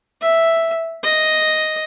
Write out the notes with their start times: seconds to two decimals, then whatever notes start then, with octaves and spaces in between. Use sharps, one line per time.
0.21 E5
1.03 D#5